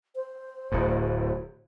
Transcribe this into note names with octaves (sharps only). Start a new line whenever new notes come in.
C5
D1 A2